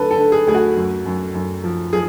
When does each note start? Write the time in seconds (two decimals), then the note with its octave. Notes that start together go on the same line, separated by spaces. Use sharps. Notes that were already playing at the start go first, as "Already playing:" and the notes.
Already playing: D2 D3 A4 B4
0.11 A4
0.17 D3
0.32 G#4
0.47 D2 G#4
0.55 F#4
0.76 F#2
1.06 F#2
1.34 F#2
1.64 F3
1.93 F3 G#4